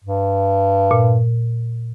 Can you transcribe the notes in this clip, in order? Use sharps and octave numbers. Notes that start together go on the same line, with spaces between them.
G2
A#2